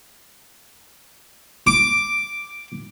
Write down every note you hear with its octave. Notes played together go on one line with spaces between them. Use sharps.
D6